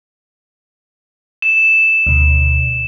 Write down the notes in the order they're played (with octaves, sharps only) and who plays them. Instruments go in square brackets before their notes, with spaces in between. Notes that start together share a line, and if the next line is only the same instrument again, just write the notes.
[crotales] E7
[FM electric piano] D2 B2